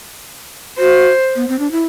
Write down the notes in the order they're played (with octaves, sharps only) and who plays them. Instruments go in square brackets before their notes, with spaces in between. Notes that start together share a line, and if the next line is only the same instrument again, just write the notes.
[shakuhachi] F#4 [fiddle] C5
[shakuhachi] B3
C4
D4
E4